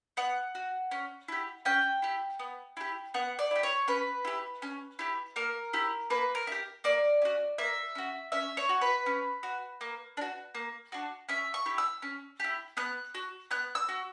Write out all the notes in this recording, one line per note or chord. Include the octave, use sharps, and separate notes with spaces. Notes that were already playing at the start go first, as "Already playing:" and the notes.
B3 F#5
F#4
C#4
E4 G4
C#4 G5
E4 G4
B3
E4 G4
B3 F#5
D5
E4 G4
C#5
C#4 B4
E4 G4
C#4
E4 G4
A#3 A#4
E4 G4
A#3 B4
A#4
E4
G4
A#3 D5
C#4 F#4
A#3 E5
C#4 F#4
C#4 E5
C#5
F#4
B4
C#4
F#4
A#3
D4
F#4
A#3
D4 F#4
C#4 E5
C#6
E4 G4
E6
C#4
E4 G4
B3 F#6
F#4
B3 F#6
E6
F#4